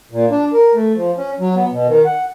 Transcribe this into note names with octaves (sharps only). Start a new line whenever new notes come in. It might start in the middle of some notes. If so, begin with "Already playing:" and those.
A#2
D4
A#4
A3
F3
C#4
F#3
B3
B2
D#3
F#5